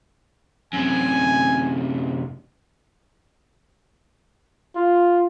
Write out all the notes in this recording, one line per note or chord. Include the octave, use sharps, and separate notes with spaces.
F#2 C3 G#5
F4